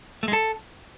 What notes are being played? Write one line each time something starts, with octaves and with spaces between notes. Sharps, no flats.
A3
G#3
A4